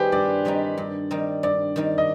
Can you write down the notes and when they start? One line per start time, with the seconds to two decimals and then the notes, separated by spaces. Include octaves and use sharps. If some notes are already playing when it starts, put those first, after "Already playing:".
Already playing: D#3 G3 C4 D#4 G4 G#4 B4 C5
0.12 G2 D5
0.45 D#3 G3 C4 D#4
0.78 G2
1.11 D#3 G3 C4 D#4
1.43 G2 D5
1.76 D#3 G3 C4 D#4
1.98 D#5